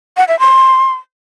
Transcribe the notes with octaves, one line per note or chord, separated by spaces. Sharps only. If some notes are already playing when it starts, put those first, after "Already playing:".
F#5
E5
C6